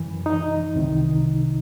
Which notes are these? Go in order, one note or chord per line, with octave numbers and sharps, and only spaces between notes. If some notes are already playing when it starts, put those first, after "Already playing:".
Already playing: F#2 E3
D#4
C2 C3 D#3